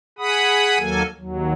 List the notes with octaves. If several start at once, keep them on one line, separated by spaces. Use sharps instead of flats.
G#4 F#5 B5 D#6
D#2 F#3 A#3 A4 G#5
D#2 F#3